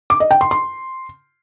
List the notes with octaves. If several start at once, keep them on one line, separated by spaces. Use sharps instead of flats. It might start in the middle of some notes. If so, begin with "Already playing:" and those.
D6
D#5
G5
C6
C6